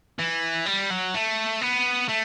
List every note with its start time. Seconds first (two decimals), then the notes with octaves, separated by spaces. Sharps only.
0.19 E3
0.66 G3
0.91 F#3
1.14 A3
1.61 B3
2.09 A3